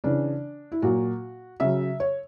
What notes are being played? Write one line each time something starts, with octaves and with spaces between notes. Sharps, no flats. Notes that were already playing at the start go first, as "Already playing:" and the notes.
C#3 E3 D4
E4
A#2 F#3 F#4
C#3 F#3 E5
C#5